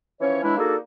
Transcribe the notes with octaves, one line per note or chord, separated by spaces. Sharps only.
E3 F3 C#4 C#5
E3 F#3 G#3 D4 E4
A#3 D4 D#4 F#4 G#4 A4